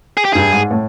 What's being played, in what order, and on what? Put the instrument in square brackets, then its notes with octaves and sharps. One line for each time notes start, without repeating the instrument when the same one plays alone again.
[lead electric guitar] G#4
G4
[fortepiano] G2 [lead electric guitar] G#4
[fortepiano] G#2
A2